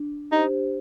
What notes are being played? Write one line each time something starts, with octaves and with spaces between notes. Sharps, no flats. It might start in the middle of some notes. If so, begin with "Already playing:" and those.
Already playing: D4
D#4 G4 C5